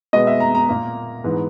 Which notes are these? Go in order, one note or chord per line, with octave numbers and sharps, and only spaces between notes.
B2 G#3 B3 D#5
E5
A#5
A#5
A#2 A#3
G#2 E3 B3